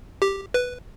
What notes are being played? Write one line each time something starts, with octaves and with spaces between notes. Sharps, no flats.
G4
B4